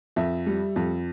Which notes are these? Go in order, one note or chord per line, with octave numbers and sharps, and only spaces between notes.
F2 E5
G3
F2